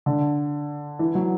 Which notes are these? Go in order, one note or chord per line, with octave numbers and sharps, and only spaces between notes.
D3
E3
F#3